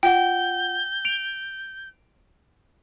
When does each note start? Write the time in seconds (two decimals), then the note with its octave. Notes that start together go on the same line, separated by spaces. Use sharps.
0.03 F4 F#5 G5 G6
1.05 D7 F7